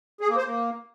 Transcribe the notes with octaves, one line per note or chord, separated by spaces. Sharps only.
G#4
A#3
C5
A#3